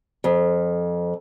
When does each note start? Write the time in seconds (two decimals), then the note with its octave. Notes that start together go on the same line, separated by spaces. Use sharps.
0.24 F2